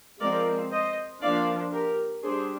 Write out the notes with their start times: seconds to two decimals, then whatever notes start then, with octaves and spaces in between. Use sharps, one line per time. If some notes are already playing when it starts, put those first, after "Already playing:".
0.20 F3 G#3 C4 A#4 D5
0.71 C5 D#5
1.22 F3 A#3 D4 D5 F5
1.72 G4 A#4
2.23 G3 D4 G#4 C5